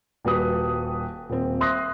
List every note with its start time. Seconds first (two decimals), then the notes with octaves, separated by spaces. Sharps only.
0.25 D#1 G3 F#4 B4 D#6
1.29 D#1 C4
1.60 E5 C6 D#6 F#6 A#6